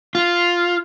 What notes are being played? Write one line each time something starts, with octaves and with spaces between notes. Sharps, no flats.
F4